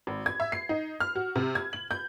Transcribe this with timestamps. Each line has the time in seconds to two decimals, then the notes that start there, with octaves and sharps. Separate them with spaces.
0.07 G#1
0.26 G#6
0.40 E5
0.52 C7
0.69 D#4
1.00 F6
1.15 F#4
1.36 C3
1.55 G#6
1.73 F#7
1.91 G6